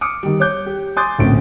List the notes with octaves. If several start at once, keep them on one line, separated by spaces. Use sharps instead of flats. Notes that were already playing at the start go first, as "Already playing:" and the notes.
D6 D#6 F6 C#7 D7
D#3 G3
C#5 D6 G6
G4
G#5 C6 D6 D#6 G6 A6
D1 A#1 A2 C3 C#4 D7